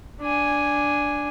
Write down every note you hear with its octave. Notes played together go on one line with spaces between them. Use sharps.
D4 G#5